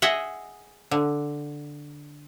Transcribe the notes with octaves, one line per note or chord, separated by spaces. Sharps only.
G#4 D#5 E5 F#5
D3